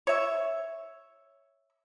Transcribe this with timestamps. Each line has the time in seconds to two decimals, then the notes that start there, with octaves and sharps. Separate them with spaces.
0.07 C#5 E5